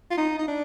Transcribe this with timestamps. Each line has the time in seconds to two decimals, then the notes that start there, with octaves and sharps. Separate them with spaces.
0.11 F4
0.18 D#4
0.39 D#4
0.48 D4